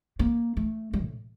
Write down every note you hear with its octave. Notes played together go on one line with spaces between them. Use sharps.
A#3
A3
G3
A2